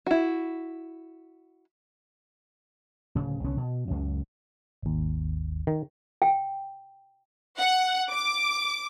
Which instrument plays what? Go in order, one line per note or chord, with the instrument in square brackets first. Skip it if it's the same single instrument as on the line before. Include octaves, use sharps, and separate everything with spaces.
[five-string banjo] E4 F#4
[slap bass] D1 C#3
C2 D3 B3 C#4
B2
C#2 F#2
[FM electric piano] G#1 D#2
[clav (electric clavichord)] D#3
[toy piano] G5
[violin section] F#5
D6